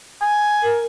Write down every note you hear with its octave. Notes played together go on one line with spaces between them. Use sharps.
G#5
A#4